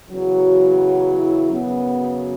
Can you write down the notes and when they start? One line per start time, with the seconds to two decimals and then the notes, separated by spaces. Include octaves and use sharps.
0.10 E2 C#3 F#3
1.16 E4
1.51 F#2 C#3 F#3 B3